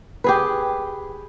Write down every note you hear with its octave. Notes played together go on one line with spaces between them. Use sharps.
G4 G#4 B4